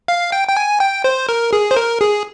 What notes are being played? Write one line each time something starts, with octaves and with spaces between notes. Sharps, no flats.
F5
G5
G5
G#5
G5
C5
A#4
G#4
C5
A#4
G#4